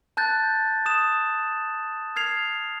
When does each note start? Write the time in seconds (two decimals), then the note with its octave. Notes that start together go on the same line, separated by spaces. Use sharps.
0.17 A5 F#6 G6 A6
0.86 D#6 E7
2.16 F6 G#6 C7 F7